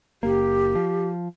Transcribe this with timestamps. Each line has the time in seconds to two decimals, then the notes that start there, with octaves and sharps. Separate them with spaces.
0.23 F#1 A#3 G4
0.75 F3